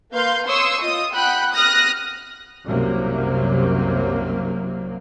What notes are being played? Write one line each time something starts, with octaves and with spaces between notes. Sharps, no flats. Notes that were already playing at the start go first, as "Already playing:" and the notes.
A#3 B4 F5 C6 G6
C#5 C6 C#6 D#6 E6
F4 D#5 D#6
F#5 G5 B5 F#6
D#6 F6 F#6 A#6
C2 F#2 C3 F#3 A#3